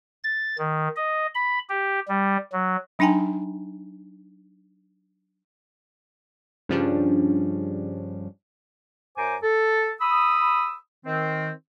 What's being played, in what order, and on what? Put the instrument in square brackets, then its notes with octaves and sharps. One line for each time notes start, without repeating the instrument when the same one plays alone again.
[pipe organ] A6
D#3
D#5
B5
G4
G3
F#3
[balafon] F#3 D4 D#4 G5 G#5 A#5
[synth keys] G2 C#3 F3 G3 C#4 D4
[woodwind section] F#2 C5 G#5 A#5 D6
A4
B5 D#6 E6
D#3 C4